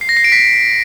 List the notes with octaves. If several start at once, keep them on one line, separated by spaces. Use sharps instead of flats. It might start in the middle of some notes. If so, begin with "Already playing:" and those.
C7
A#6
C7
D7
B6